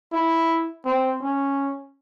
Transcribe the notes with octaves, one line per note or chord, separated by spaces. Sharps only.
E4
C4
C#4